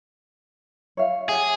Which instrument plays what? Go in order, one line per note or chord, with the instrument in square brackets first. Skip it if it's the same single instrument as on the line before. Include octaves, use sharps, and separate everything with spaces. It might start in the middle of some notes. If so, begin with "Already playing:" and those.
[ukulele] C#5 E5 F5
[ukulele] G4 F#5 [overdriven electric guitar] G#4